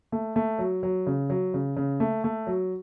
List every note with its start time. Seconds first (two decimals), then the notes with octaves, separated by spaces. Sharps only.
0.12 A3
0.36 A3
0.59 F#3
0.83 F#3
1.07 C#3
1.30 F#3
1.54 C#3
1.77 C#3
2.00 A3
2.24 A3
2.47 F#3